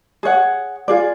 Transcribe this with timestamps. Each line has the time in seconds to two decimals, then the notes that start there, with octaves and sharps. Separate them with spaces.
0.23 G#4 C#5 F#5
0.88 F4 G#4 D5